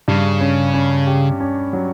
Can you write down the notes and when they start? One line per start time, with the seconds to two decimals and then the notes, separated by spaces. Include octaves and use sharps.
0.08 G2 C#3
0.41 C#4
0.74 C#4
1.07 G4
1.40 C#4
1.73 F#3